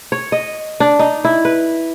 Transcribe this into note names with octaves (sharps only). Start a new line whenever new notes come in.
C#5
D#5
D4
D#4
E4
B4